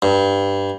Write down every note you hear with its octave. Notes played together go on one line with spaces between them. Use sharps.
G2